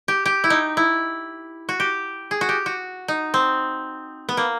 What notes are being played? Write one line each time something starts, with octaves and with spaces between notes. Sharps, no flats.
G4
G4
E4
D#4
E4
F#4
G4
G#4
F#4
G4
F#4
D#4
C4
B3
A#3